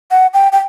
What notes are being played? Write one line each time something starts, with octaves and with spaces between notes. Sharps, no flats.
F#5
G5
G5